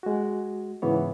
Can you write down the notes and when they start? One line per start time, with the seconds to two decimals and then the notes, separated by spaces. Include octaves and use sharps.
0.03 G#3 F#4
0.82 G#2 C#3 E3 B3 C#5